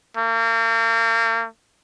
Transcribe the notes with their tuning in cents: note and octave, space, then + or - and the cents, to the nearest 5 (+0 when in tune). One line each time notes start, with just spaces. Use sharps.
A#3 -40